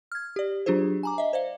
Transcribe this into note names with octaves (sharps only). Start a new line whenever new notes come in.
F6 G#6
G4 D5
F#3 D4 F4 G4 G#4 C5
G#5 A#5 D6
D#5 E5
C5 D5 F5